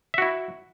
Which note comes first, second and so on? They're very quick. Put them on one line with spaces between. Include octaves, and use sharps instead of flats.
E5 F#4 E4